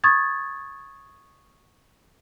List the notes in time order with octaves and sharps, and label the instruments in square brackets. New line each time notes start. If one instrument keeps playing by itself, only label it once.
[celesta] C#6 D#6 G#6 A6